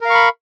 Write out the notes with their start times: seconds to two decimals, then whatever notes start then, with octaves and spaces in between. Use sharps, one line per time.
0.01 A#4
0.05 F5
0.10 C#6
0.14 B5